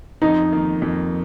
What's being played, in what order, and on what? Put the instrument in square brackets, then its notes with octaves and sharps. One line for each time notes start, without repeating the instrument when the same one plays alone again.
[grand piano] F2 [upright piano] D#4
[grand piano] D#3 A#3
F2